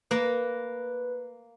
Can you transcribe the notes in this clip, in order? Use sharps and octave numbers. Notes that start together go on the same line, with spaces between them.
A#3 B4